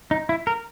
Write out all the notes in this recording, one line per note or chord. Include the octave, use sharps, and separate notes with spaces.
D#4
E4
A#4